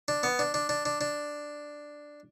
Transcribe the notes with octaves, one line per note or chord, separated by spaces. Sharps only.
D4
B3
D4
D4
D4
D4
D4